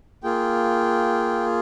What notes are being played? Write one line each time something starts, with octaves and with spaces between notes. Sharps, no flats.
A#3 F4 G#4 G5